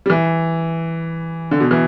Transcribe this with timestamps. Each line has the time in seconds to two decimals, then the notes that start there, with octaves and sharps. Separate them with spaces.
0.06 G3
0.10 E3
1.51 D3
1.60 B2
1.71 E3